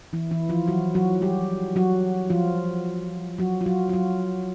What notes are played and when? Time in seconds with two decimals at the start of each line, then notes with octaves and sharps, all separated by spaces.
0.13 E3 E4
0.31 E3 E4
0.49 F3 F4
0.68 F#3 F#4
0.95 F#3 F#4
1.21 G3 G4
1.76 F#3 F#4
2.30 F3 F4
3.38 F#3 F#4
3.61 F4
3.66 F#3 F#4
3.89 F4
3.93 F#3 F#4